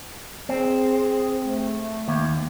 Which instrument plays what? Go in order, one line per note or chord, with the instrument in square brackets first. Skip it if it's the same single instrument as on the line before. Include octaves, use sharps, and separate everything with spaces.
[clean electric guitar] C4 [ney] G#4
[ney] A3
[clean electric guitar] D#2